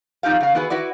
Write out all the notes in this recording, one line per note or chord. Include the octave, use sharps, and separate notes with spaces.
F2 D#4 F4 G4 F5
C#3 F5
B3 E4 F#4 G#4 B4
E4 F#4 B4 D5